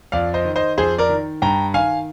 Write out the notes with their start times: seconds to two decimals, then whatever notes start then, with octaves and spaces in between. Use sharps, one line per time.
0.12 F2 D5 F5
0.34 C5 D#5
0.45 D#3
0.56 C5 D#5
0.77 F2 G#4 C5
0.98 A#4 D5
1.09 D#3
1.42 G2 G5 A#5
1.74 D#3 F5 G#5